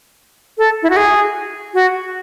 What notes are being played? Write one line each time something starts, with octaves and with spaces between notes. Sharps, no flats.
A4
E4
F#4
G#4
F#4